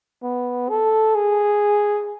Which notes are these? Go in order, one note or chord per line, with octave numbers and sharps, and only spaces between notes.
B3
A4
G#4